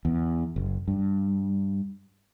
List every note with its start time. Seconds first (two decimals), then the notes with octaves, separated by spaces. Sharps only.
0.05 E2
0.56 F#1
0.88 G2